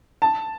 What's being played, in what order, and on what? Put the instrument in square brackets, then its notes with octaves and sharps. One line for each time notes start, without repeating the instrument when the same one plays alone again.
[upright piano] A5